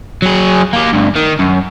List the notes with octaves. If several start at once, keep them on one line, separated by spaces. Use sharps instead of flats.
F#3 G#4
A#3 G4
D2 G2
D#3
F#2